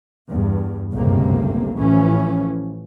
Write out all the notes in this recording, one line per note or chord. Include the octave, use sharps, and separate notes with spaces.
E2 G2
G1 C#2 F#2 A2 C3 A#3
A1 E3 F3 C#4